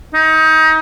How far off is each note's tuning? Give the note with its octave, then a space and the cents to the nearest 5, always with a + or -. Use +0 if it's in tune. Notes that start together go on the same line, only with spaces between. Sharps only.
D#4 +25